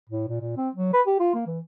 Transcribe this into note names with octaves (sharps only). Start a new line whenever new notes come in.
A2
A#2
A#2
C4
F#3
B4
G4
F4
A#3
E3